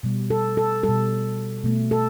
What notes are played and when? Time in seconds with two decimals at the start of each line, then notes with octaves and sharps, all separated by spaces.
0.03 B2 G3
0.30 A4
0.57 A4
0.83 B2 G3 A4
1.64 B2 A3
1.91 A4